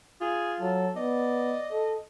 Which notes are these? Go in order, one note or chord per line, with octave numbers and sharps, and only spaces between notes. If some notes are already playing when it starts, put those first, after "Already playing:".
F4 G#4
F#3 A4
B3 D5 D#5
A4